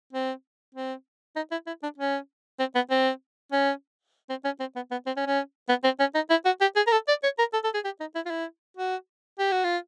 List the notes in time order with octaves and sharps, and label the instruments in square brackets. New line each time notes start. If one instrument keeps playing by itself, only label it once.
[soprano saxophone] C4
C4
D#4
E4
E4
D4
C#4
C4
B3
C4
C#4
C4
C#4
C4
B3
B3
C4
C#4
C#4
B3
C4
C#4
D#4
E4
F#4
G4
G#4
A#4
A4
D5
C#5
A#4
A4
A4
G#4
G4
D#4
E4
F4
E4
F#4
G4
F#4
F4